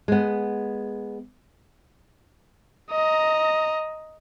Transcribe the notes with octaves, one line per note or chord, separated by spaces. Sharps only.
G#3 B3
D#5 A#5